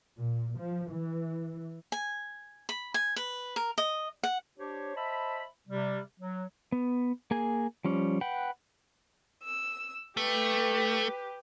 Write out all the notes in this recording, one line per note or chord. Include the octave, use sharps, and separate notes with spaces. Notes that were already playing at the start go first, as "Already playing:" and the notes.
A#2
F3
E3
G#5
B5
G#5
B4
A#4
D#5
F#5
D4 G4 C5 C#5
C5 D#5 E5 A5 B5
C3 G3
F#3
B3
A#3 G#4 G#5
F3 G3 C#4
B4 F#5 G5
E6
A3 G4 B4